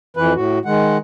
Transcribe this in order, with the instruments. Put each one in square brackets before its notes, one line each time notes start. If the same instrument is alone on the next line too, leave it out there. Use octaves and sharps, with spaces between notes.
[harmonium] F2 E3 B4
A2 F#4
D#3 G#3 F#5